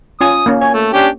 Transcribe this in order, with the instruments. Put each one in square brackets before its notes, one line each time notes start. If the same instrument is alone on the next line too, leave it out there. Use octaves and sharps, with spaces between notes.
[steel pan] C#4 F4 G#5 [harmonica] D#6
[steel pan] A#3 C#4
[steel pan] C#5 [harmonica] G#5
[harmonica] A3
C#4 D4 G4